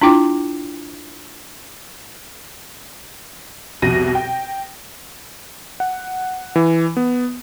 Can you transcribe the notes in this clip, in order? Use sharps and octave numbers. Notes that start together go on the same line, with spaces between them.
D4 E4 F4 G5 D6
C2 F2 B2 A#6 D#7
G5
F#5
E3
B3